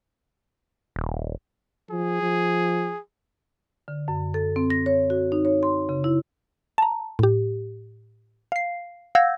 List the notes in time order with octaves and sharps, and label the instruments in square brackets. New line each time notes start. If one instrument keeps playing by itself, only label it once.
[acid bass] D#1
[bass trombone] F3 [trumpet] G#4
[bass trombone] F3
[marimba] D3
F#2
A4
C4
A#6
C#5
F#4
D#4
C#5
C6
C#3
E4
[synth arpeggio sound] A5 A#5
A2 G4
F5 C7
F5 F#5 E6 G6 G#6 A#6